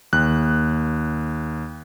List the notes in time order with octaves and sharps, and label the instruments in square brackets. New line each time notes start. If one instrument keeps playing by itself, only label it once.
[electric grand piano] D#2 F#6